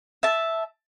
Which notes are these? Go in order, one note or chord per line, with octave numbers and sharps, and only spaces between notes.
E5 A5